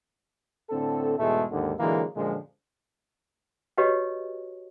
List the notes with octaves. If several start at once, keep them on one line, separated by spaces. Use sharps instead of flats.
A2 D3 C4 A4
E2 G#2 B2 G#3 A3
D#2 G#2 D3
A#2 D3 E3 F#3 G#3 A#3
F#2 A#2 D3 F3 G#3
F#4 G4 B4 C#5 D#5